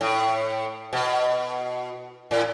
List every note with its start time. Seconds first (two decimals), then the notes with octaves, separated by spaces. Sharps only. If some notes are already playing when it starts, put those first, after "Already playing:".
0.01 A2
0.93 B2
2.31 A2